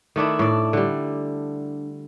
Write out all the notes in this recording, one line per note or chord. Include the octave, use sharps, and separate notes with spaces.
D#3 A3 D4 E4
A2 D5
D3 G3